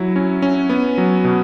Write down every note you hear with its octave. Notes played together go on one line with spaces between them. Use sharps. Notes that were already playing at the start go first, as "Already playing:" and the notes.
Already playing: F#3 E4
C#4
C#4
B3
F#3
B2